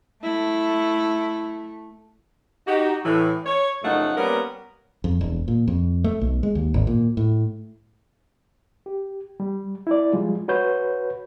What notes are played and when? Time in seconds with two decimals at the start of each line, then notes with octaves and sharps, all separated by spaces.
0.23 A3 E4
2.67 D#4 F#4 G4
3.05 A2 E3
3.45 C#5
3.83 F#2 C#3 F3 A3 D#4 F#5
4.16 G3 A#3 B3 C#4 A#4
5.04 F2
5.21 E1
5.48 A#2
5.68 F2
6.04 A3
6.21 B1
6.43 G#3
6.55 D#2
6.74 G#1
6.87 A#2
7.17 A2
8.86 G4
9.40 G3
9.87 E4 D5
10.13 F3 G3 G#3 F4
10.48 F#4 B4 C#5 G6